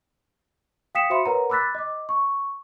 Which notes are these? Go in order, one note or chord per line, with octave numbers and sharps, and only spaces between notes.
F5 G5 D#6 B6 C#7 E7
F#4 C5 E5 B5 C6 C#7
A#4 B4 C#5 F#5 A#5
B5 D6 E6 F#6 A6 B6
D#5 D6
C#6